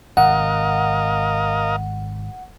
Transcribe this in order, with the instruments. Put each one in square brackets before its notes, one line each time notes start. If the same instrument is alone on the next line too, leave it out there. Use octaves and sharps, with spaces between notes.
[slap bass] G#1 C3 [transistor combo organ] A#4 D#5 F5 [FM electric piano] F#5